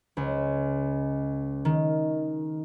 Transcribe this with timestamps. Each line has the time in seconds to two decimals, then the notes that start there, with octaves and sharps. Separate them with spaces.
0.17 C#2
1.65 D#3